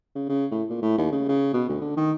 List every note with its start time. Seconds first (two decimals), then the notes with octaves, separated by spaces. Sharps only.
0.15 C#3
0.29 C#3
0.51 A2
0.69 A#2
0.82 A2
0.98 D#2
1.12 C#3
1.28 C#3
1.53 B2
1.69 D2
1.81 D3
1.96 D#3